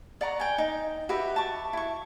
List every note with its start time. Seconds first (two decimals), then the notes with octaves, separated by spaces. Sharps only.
0.21 D5 F#5 A#5 C#6
0.40 G5 G#5
0.58 D#4
1.09 F#4 G4 B4 E5
1.36 A5 C#6
1.73 E4 C#6